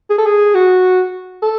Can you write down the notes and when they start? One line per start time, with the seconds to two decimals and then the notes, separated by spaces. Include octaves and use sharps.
0.10 G#4
0.18 A4
0.26 G#4
0.54 F#4
1.42 A4